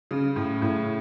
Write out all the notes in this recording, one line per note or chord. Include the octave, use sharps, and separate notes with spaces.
C#3
A2
A2